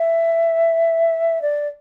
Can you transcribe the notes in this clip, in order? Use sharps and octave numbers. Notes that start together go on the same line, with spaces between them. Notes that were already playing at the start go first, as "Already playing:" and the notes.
Already playing: E5
D5